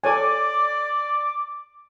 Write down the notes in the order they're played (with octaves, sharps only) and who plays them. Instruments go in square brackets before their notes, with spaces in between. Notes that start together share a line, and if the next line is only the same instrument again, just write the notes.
[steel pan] A4 C#5 G#5 [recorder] D5 [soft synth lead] D6